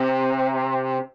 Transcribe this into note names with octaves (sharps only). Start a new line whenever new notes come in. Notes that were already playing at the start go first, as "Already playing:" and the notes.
Already playing: C3